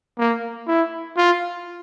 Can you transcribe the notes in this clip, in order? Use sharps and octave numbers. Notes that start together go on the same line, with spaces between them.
A#3
E4
F4